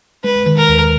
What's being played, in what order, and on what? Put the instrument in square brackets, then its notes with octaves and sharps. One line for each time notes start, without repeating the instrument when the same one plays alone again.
[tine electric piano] G#3 [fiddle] B4
[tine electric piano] D#3
[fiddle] A#4
[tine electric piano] D#2